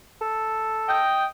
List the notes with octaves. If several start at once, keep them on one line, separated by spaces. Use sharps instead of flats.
A4
D#5 G5